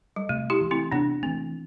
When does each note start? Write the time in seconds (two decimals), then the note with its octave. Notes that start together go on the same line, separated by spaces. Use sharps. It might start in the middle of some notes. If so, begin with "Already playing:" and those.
0.16 G3
0.29 C3 A3
0.50 E4 G4
0.61 E3 A3
0.71 C4 E4
0.92 C3 B3 D4
1.22 E3 A3 C4